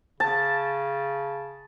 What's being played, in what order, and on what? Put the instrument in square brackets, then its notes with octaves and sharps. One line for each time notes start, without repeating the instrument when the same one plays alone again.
[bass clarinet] C#3 [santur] A5